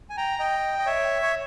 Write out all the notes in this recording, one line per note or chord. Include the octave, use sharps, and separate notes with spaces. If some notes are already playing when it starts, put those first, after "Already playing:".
G#5
G5 A#5
D#5 G5
D#5
C#5 E5
C#5